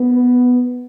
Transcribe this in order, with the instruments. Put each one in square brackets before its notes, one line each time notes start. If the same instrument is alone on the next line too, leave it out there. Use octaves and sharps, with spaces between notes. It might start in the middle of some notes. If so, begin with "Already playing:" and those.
Already playing: [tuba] B3